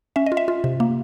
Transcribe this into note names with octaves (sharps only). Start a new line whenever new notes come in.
C#4 E5
D#5
F4
E5
F4
C3
A#3